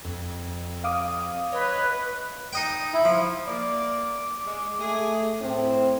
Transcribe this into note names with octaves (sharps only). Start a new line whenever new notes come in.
F2
F5 D6 D#6
B4 C#5 D#5
D#4 D#5 G5
E4
F3
A#3 D5 D6
G#3
A3 G#4
A2 C4